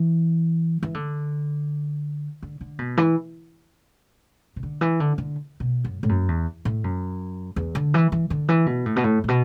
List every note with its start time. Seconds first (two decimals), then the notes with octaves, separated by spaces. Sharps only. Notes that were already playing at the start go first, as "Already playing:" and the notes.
Already playing: E3
0.83 E3
0.94 D3
2.43 D3
2.61 D3
2.79 B2
2.97 E3
4.56 B2
4.63 D3
4.81 E3
5.00 D3
5.18 D3
5.60 B2
5.84 F#2
6.03 A2
6.09 F#2
6.28 E2
6.65 A2
6.84 F#2
7.56 E2
7.75 D3
7.94 E3
8.12 E3
8.30 D3
8.49 E3
8.66 B2
8.86 A2
8.96 B2
9.04 A2
9.24 A2
9.28 B2